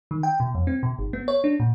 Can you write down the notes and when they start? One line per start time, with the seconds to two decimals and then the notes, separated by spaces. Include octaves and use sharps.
0.11 D#3
0.23 G5
0.40 B2
0.55 F2
0.67 C4
0.83 B2
0.99 G1
1.13 B3
1.28 C#5
1.44 D4
1.60 A#2